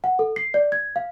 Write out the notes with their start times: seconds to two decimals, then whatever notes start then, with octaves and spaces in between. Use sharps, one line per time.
0.04 F#5
0.19 A4
0.36 C7
0.54 D5
0.72 G#6
0.96 F5